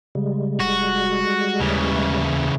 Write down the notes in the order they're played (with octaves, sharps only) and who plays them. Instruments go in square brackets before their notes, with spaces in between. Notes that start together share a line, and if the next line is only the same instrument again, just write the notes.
[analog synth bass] C#3 [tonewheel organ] G3 G#3
[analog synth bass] F1 [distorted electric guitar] F#4
[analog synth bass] D#2 [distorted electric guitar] C#3 E3